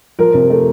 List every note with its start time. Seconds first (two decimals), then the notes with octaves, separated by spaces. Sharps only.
0.19 F3 A#4
0.34 C3
0.50 A3